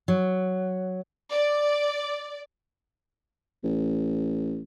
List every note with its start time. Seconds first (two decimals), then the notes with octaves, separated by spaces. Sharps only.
0.08 F#3
1.31 D5
3.64 A1